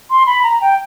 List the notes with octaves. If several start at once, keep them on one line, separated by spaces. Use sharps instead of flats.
C6
B5
A#5
G5